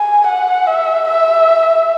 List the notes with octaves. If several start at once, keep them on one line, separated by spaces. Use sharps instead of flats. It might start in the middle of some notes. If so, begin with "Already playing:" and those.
Already playing: G#5
F#5
E5
E5